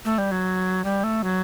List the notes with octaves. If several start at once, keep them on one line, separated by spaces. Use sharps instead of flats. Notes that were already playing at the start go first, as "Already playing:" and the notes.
A3
G3
F#3
G3
A3
F#3